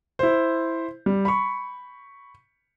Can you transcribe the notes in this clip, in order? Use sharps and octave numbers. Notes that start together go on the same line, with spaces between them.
E4 C5
G3
B5 C#6